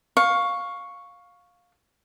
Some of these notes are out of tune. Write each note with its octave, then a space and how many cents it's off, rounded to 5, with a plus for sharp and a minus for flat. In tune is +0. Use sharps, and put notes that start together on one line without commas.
F5 +15 C#6 +0